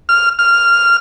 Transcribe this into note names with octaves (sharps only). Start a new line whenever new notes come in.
F6
F6